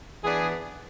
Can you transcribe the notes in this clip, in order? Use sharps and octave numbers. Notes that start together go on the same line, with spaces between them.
E3 B3 D4 G#4